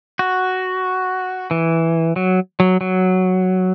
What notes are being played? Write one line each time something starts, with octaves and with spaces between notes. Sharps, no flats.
F#4
E3
F#3
F#3
F#3